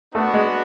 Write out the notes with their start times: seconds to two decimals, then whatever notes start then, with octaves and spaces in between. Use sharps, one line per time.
0.14 A3 B3 D4 F#4
0.34 G#3